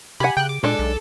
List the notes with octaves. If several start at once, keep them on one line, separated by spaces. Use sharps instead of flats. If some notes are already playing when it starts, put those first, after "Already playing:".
C3 G4 F#5 G#5 B5
C#3 G5 F#6
D6
A#2 G#3 D4 A4
B1